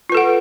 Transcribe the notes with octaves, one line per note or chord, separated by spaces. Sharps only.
F4 A4 B4 F#5